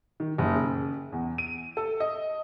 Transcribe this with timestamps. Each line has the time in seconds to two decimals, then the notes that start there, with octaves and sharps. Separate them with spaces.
0.20 D#3
0.38 F#1
0.55 C#3
1.12 E2
1.38 D#7
1.77 A4
2.00 D#5